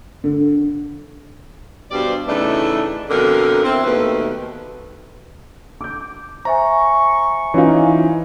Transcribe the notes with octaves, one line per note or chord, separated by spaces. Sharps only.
D3
G2 B2 G3 C5 D5
A2 C#3 E3 A3 D4 D#4
F2 B2 D3 A#4
C4 E4
D#2 B2 A3 B4
D6 G6
C5 E5 G#5 A#5 C#6
E3 C#4 D#4 F4